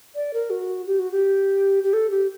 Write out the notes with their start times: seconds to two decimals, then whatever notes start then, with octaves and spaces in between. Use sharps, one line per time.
0.15 D5
0.33 A#4
0.50 F#4
0.87 G4
0.99 F#4
1.11 G4
1.83 G4
1.93 A4
2.11 G4